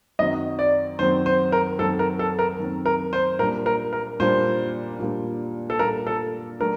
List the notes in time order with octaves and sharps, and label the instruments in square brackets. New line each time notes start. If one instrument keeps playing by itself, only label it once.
[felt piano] F#2 D#3 F#3 C4 [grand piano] D#5
[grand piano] D5
[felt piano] F#2 D#3 F#3 C4 [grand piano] C5
[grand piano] C5
A#4
[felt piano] F#2 D#3 F#3 C4 [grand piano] A4
[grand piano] A#4
A4
A#4
[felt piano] F#2 D#3 F#3 C4
[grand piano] A#4
C5
[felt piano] A#2 G3 A#3 D4 [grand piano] A#4
[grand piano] A#4
A#4
[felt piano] A#2 G3 A#3 D4 [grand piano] C5
[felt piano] A#2 G3 A#3 D4
[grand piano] A4
[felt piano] A#2 G3 A#3 D4 [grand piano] A#4
[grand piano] A4
[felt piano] F#3 A3 D4 [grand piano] A#4